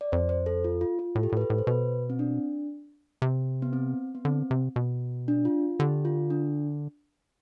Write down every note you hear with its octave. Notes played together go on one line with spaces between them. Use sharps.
D5
F2 C5
C5
A4
F4
F4
F4
A2 A4
G4
A4
A2 B4
A4
A2
C5
B2 B4
C4
D4
C3
B3
C4
B3
D3 C4
C3
B2
D4
F4
D3 G4
F4
D4